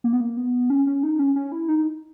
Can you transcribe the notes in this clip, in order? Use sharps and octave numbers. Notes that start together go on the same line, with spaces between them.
A#3
B3
A#3
B3
C#4
C#4
D#4
C#4
C#4
E4
D#4